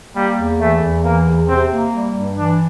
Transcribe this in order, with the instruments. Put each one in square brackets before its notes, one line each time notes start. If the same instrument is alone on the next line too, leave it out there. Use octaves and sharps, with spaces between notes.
[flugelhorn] G3 [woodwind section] A#3
[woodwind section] E2
[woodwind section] E3 [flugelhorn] A3
[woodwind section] E2
[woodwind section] E3 [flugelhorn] A#3
[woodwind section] E2
[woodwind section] C3 [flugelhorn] C4
[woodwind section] A#3
G3
G2
[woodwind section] E3 [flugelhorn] D4